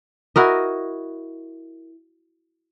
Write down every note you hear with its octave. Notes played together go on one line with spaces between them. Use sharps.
E4 F#4 A#4 D#5